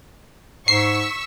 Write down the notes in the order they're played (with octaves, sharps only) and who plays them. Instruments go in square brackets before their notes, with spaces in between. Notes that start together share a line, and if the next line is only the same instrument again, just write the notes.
[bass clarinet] G#2 [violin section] C#6 E6 B6 [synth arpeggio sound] C7